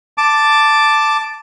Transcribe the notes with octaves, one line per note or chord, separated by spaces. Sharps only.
A5 D6